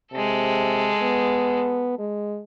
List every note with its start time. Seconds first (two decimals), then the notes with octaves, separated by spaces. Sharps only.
0.12 C3 G#3 A4
1.02 B3
1.98 G#3